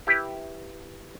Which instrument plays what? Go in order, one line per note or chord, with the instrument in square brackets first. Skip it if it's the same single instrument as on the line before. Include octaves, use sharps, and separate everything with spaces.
[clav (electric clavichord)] E4 G4 B4